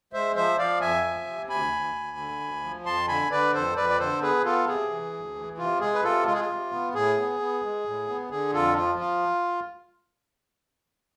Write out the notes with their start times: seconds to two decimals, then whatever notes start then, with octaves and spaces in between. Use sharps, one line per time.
0.13 G#3 C5 E5
0.36 F3 C5 E5
0.58 F3 D5 F5
0.81 F2 E5 G#5
1.04 F3
1.27 C3
1.49 D2 G#5 B5
1.72 D2
1.95 D2
2.17 D3
2.40 D2
2.63 F3
2.86 F2 A5 C6
3.08 D3 G#5 B5
3.31 D3 B4 D5
3.54 F2 A4 C5
3.76 F2 B4 D5
3.89 D5
3.99 D3 A4 C5
4.22 B3 G#4 B4
4.44 B3 F4 A4
4.67 C3 G#4
4.90 E3
5.13 D2
5.36 E3
5.58 C3 F4
5.81 G#3 G#4
5.94 B4
6.03 C3 F4 A4
6.26 G#3 F4
6.33 G#4
6.41 F4
6.49 C3
6.72 B3
6.95 A2 G#4
7.17 B3
7.40 B3
7.62 G#3
7.85 A2
8.08 B3
8.31 D3 G#4
8.53 F2 F4 A4
8.76 F3 F4
8.99 F4